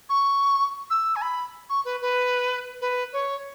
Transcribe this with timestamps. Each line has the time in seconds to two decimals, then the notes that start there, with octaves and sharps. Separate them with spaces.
0.09 C#6
0.90 E6
1.16 G#5
1.22 B5
1.69 C#6
1.85 B4
2.02 B4
2.81 B4
3.13 C#5